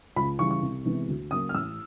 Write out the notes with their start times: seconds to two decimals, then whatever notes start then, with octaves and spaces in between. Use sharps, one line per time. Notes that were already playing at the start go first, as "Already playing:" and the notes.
0.16 C#2 B5
0.39 C#3 E3 G3 C#6
0.51 C#6
0.63 C2
0.85 C3 E3 G#3 B3
1.08 D2
1.31 C#3 F#3 A#3 D#6
1.49 F6
1.54 A1 E6